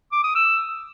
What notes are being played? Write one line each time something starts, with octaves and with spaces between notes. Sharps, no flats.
D6
D#6
E6